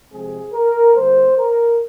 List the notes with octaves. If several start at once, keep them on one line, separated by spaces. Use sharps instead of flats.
F2 C3 F3 G#3 C4 G#4
A#4
D3 G3 A#3 C5
A#4